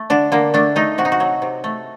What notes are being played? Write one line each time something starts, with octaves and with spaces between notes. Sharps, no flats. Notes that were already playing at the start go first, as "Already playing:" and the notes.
Already playing: A3
D3 D4
D3 A#3
A3 D4
A3 D#4
C3 F#4
D#4
F#4
F#3
C3
A3